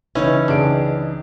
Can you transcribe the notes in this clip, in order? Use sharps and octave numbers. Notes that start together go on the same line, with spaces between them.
C#3 E3 C#4 D#4 E4 B4
C#2 D4 G#4 D7